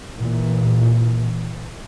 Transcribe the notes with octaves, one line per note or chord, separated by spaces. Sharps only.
A#2 E3